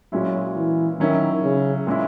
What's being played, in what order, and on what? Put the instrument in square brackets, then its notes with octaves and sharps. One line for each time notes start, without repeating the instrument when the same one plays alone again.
[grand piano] A#2 G#3 C#4 E4 [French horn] F#3
[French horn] E3
[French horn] D#3 [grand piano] F#3 C#4 E4
[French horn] C#3
[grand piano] A#2 G#3 C#4 E4